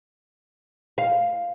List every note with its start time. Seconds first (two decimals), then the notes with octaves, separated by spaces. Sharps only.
0.98 F5